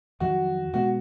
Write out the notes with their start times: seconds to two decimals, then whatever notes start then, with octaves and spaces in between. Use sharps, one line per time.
0.20 F2 D#3 F#3 F#4
0.73 B2 G#3 B3 F#4